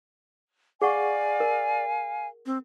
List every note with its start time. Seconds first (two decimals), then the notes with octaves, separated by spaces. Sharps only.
0.82 G#4 D5 F5 F#5 G#5 C#6
1.40 A#4
2.46 C4